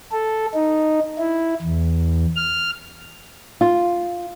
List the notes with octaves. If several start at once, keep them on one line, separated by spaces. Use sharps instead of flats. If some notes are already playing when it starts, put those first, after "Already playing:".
A4
D#4
E4
E2
F6
F4